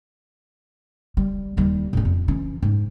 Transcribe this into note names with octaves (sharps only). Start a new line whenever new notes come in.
G3
D#2 G3
A2 C#4
F2
E3 C#4
G#2